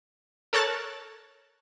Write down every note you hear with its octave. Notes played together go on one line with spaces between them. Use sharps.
A4 A#4 C#5 A5 F#6 A6